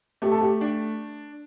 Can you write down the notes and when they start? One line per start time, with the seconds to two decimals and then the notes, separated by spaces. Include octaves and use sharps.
0.22 A3 G4
0.32 A4
0.41 G4
0.61 D4